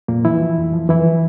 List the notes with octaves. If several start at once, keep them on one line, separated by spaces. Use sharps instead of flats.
F2 A#2 A#3
E3 F3 E4
F3
F2
F3
F2 E3 E4